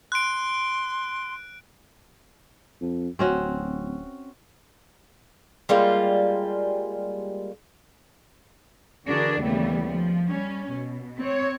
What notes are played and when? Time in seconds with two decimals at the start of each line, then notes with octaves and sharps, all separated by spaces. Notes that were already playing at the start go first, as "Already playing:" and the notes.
0.12 C6 F#6 D7
2.81 F2
3.19 D1 C4 C#4 F#4
5.69 G3 G#3 A#3 F4
9.07 D3 E3 D4 F#4 G#4 A#4
9.40 D#2 C#3 E3 G3 A3 B3
9.88 F3
10.27 G3 C#4
10.72 B2
11.17 C4 C#5